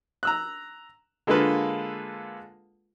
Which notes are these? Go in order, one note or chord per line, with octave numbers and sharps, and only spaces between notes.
A#5 E6 F#6
D3 G#3 A#3 F4 A4 B4